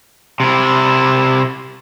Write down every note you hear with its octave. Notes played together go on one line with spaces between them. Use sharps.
C3 E4